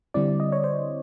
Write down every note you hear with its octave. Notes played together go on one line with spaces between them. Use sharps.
D3 G3 C4 E4 D5
D#5
C#5
C5